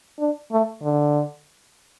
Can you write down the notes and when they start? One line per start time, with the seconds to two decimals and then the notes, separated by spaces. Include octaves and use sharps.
0.19 D4
0.52 A3
0.83 D3